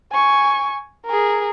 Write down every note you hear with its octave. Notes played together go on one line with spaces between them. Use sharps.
G#5 C#6
G#4 A#4